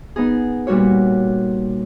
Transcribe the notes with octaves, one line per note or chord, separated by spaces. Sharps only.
B3 D#4 G#4
A#2 G3 F#4 C#5